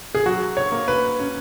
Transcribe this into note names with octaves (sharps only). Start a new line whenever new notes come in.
G#4
F#3 F#4
C#5
A#3
B4
C#4